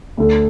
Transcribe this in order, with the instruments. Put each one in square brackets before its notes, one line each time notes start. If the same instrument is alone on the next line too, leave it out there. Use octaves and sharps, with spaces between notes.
[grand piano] D2 D3